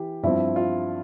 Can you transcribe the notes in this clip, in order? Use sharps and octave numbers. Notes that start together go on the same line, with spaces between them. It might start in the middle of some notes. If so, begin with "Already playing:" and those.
Already playing: E3 G4
G2 F3 C4 E4
F4